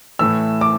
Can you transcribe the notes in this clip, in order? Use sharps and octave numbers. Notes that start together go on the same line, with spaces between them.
A2 E3 A3 E6
D6